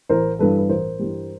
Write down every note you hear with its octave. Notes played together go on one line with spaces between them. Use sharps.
A1 A#4 C5
G2 E3 G3 A4 B4
B4
A1 A#4 C5
G2 E3 G3